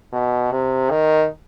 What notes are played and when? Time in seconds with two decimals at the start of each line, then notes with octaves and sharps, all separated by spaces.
0.13 B2
0.51 C3
0.90 D#3